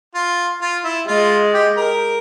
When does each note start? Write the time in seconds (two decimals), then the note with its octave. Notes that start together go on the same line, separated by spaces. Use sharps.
0.15 F4
0.61 F4
0.84 E4
1.08 G#3 F4
1.54 G4
1.77 A#4